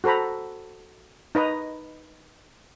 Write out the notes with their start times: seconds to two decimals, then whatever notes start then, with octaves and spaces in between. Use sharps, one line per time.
0.04 F#4 A4 C5 A#5 B5
1.35 D#4 B4 D#5 A#5